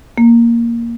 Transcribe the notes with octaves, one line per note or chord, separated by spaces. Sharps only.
A#3